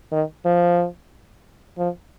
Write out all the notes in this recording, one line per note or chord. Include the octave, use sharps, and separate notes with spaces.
D#3
F3
F3